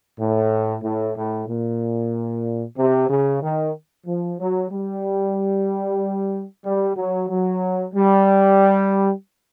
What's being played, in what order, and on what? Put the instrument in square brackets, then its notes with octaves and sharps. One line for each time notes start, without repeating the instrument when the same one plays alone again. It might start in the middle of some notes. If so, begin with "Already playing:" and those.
[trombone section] A2
A2
A2
A#2
C3
C#3
D#3
F3
F#3
G3
G3
F#3
F#3
G3